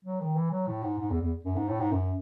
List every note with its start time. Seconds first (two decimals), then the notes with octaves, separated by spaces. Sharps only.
0.05 F#3
0.21 D#3
0.36 E3
0.51 F#3
0.67 A2
0.83 G#2
0.98 G#2
1.10 E2
1.22 E2
1.45 F#2
1.56 G#2
1.68 A2
1.80 G#2
1.92 F#2